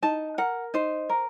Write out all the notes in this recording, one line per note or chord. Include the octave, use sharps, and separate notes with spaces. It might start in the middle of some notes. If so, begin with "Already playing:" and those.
D#4 A5
A#4 F#5
D#4 C5
A#4